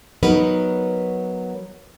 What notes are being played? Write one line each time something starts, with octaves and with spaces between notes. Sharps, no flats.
F#3 B3 D#4 A#4 B4